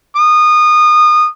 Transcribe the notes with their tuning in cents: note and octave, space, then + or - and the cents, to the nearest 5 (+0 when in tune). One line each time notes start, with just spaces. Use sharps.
D#6 -25